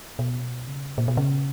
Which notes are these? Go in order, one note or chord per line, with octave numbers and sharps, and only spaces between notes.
B2
C#3
A#2
B2
C#3